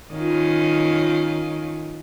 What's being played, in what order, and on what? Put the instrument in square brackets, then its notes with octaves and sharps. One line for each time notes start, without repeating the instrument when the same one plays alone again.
[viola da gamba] D#3 C#4 F4